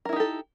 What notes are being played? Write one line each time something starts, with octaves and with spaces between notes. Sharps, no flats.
D#4 E4 G4 A4 A#4